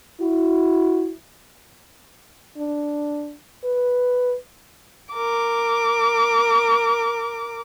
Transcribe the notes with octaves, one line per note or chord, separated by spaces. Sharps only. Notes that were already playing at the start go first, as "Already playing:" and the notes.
E4 F#4
D4
B4
A#4 D6